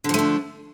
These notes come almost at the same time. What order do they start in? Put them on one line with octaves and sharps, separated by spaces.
D3 F3 A3 D4